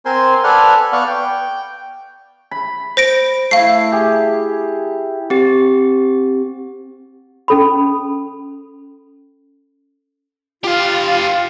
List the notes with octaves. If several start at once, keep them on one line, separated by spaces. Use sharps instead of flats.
C4 A#4 C5 G#5 C6
A4 B4 D5 F#5 G#5 F6
B3 D5 F5 F#5 C#6
G5
B5
C5 A#6 D7
A3 E4 F5 C7
G4 G#4
C4 G4
C#4 A4 B5
F4 G4 F5